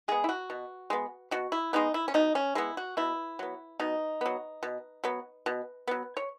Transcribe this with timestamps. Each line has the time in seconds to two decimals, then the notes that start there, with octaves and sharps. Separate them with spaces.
0.08 G#3 B3 G#4
0.24 E4
0.29 F#4
0.50 B2
0.90 G#3 B3
1.31 B2 F#4
1.52 E4
1.73 G#3 B3 D#4
1.94 E4
2.08 C#4
2.14 B2 D#4
2.35 C#4
2.55 G#3 B3 E4
2.77 F#4
2.97 B2 E4
3.39 F#3 B3
3.79 B2 D#4
4.21 F#3 B3
4.63 B2
5.04 F#3 B3
5.46 B2
5.87 F#3 B3
6.17 C#5